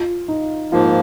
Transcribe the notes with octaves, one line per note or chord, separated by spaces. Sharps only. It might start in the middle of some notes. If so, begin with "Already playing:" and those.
Already playing: F4
D#4
G#2 F3 A#3 F4